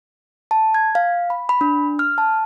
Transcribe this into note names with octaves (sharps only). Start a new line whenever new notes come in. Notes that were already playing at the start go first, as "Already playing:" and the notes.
A5
G#6
F5
B5
B5
D4
F6
A5